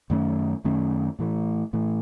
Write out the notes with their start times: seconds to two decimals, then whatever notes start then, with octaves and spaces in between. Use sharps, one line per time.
0.10 F#2 D#3 A3 C#4
0.64 F#2 D#3 A3 C#4
1.19 A2 E3 A3
1.73 A2 E3 A3